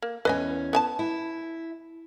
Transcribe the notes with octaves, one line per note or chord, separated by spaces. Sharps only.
A#3
E2 C#4 B4 D#5 G#5
B3 G#5 A5
E4